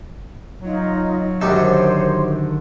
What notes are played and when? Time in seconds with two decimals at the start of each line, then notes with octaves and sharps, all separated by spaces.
0.62 F#3 D#4 F4
1.41 F#2 D3 D#3 G3 D#4 A4 C5 C6